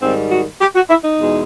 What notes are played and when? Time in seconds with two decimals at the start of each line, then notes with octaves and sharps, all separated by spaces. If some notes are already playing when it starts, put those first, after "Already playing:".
0.02 G#2 D#3 G3 C4
0.32 F#4
0.60 G4
0.75 F#4
0.89 E4
1.03 D#4
1.19 E2 B2 G#3